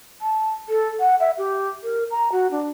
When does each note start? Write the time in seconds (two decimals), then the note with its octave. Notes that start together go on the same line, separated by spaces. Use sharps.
0.22 A5
0.69 A4
1.00 F#5
1.20 E5
1.38 G4
1.83 A#4
2.11 A#5
2.32 F#4
2.51 D4